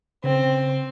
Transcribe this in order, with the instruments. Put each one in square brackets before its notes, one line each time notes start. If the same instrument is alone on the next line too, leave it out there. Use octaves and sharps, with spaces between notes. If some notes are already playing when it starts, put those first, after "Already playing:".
[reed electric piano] C#3 [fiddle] C4